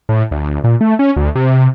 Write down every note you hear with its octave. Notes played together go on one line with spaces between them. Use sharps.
A2
D2
A#2
A3
C#4
D2
C3